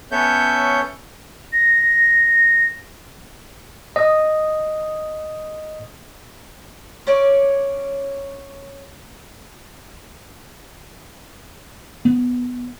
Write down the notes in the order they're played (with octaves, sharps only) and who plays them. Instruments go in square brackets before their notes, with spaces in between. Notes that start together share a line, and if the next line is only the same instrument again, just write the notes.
[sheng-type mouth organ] B3 C#4 A4 C#5 E5 G6
[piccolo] A#6
[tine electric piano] D#5 D#6
[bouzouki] C#4 C#5 D5
[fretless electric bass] B3